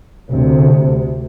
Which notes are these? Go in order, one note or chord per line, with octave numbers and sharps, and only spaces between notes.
D2 C3